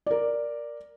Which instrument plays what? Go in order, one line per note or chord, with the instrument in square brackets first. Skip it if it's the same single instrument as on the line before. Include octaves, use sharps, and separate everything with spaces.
[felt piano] A#4 D5